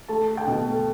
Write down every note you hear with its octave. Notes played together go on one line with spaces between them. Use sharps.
A3 A5
A3
G5
B2
A3